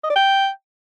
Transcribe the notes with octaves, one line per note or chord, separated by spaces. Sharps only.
D#5
D5
G5